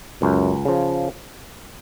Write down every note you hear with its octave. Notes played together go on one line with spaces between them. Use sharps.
C#2 F#2
C#3 F3